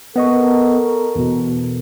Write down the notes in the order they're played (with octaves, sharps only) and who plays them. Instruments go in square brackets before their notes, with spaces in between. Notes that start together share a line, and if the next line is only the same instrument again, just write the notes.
[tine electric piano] B3 D#5 C#6 [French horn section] A4 A#4
[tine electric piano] E2 B2